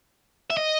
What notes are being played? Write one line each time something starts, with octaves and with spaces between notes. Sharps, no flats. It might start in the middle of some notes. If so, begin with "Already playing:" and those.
E5
D#5